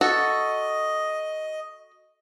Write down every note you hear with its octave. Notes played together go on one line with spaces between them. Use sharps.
F#4 A4 D#5